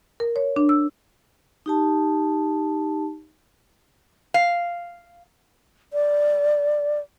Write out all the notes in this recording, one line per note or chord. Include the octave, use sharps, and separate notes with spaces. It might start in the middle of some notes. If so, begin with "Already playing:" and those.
A#4
C#5
D4
E6
D#4 G4 A5
F5
D5